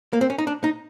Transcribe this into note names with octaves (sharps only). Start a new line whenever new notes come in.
A#3
C4
C#4
D#4
D4
D#4